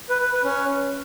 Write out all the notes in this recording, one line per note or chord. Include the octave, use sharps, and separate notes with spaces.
B4
B4
B4
C#4